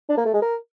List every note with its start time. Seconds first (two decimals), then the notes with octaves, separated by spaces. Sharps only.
0.09 D4
0.17 A#3
0.26 A3
0.34 G#3
0.42 A#4